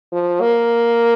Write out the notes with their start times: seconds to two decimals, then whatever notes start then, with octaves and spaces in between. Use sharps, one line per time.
0.12 F3
0.41 A#3